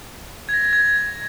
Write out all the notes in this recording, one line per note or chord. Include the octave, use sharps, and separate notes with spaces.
G#6
A#6
G#6